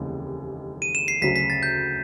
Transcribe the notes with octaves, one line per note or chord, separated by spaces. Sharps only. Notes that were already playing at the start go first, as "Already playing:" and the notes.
Already playing: F1 D#2 C#3 E3 G#3
D#7
E7
C7
D2 C#3 F#3 B6
B6
A6
G6